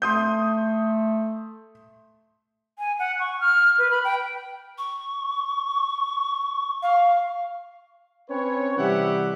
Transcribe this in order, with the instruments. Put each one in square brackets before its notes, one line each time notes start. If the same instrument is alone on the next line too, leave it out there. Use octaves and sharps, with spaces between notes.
[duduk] A3 [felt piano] C6 D#6 G6
[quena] G#5
F#5
C#6
F6
B4
B5
G5
[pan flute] C#6
[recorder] F5
[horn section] C4 C#4 B4 C#5
C3 E3 G3 G4 E5 F#5